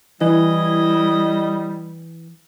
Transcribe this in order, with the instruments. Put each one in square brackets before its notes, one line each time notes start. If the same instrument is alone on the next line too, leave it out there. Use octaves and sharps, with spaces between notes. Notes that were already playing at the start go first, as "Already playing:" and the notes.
[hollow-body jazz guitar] E3 [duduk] G3 [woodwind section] E4 [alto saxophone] D#5